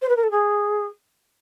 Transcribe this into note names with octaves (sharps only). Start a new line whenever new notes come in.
C5
B4
A#4
A4
G#4